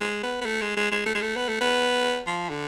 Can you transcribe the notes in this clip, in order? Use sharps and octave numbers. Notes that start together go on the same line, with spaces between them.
G#3
B3
B3
A3
G#3
G#3
G#3
A3
G#3
A3
B3
A3
B3
F3
D3